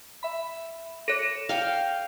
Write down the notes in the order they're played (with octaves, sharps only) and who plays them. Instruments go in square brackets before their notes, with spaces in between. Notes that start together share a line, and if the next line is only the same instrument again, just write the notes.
[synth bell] E5 B5
[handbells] A4 C#5 [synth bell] A#6 C#7 E7
[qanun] F5 G5